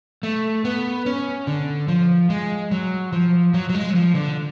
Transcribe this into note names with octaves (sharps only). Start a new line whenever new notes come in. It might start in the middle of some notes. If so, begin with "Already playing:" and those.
A3
B3
C#4
D3
F3
G#3
F#3
F3
F#3
F#3
G#3
F#3
F3
D3